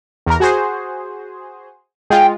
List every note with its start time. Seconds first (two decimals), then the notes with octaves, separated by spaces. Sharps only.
0.26 E2 A#4
0.40 F#4 G#4 C5
2.10 G#3 F4 G5